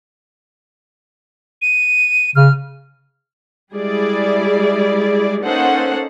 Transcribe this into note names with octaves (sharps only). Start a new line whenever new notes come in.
D#7
C#3 F6
G3 G#3 E4 G#4 D5
A#3 C#4 D#4 A4 C5 F#5